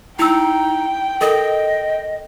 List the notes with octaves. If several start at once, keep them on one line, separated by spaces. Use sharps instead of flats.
D#4 E4 G5 E6
A4 A#4 D#5